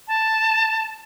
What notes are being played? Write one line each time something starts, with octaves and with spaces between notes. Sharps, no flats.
A5